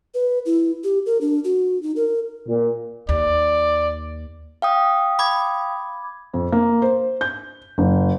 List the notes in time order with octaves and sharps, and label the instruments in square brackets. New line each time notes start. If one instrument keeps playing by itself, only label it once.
[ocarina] B4
E4
G4
A#4
D4
F#4
D#4
A#4
[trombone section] A#2
[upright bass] D#2 [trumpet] D5
[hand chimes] F5 G5 D#6
[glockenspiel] B5 D6 G#6
[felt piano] F2
A#3
C5
G6
F#1